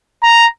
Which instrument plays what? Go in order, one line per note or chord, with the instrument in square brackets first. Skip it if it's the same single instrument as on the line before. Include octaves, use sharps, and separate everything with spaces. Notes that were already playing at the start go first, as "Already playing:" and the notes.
[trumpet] A#5